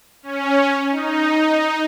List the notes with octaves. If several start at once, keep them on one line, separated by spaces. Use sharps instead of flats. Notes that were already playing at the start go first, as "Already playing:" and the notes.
C#4
D#4